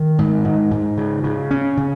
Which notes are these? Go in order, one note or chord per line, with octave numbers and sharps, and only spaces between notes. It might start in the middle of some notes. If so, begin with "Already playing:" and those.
Already playing: D#3
G#2
G#2
G#2
C#3
C#3
C#4
C#3